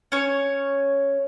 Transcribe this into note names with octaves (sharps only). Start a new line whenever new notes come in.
C#4 C#5